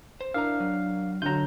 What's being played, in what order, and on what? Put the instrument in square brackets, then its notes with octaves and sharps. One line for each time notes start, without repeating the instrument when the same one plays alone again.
[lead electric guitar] C5
[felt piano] D4 A#4 D5 [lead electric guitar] E4 A#5 [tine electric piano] F5
[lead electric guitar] F#3
[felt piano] D3 F#3 [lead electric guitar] F4 F#4 [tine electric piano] A#5 G6